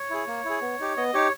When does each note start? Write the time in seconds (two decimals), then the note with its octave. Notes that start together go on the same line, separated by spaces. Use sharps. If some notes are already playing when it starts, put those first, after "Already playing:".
Already playing: C#5
0.10 E4 G#4
0.27 A#3
0.45 E4 G#4
0.62 B3
0.80 D#4 G4
0.97 B3 D#5
1.14 D#4 G4 C#5